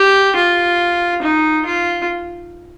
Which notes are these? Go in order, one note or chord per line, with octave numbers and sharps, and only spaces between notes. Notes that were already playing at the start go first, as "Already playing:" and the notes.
Already playing: G4
F4
D#4
F4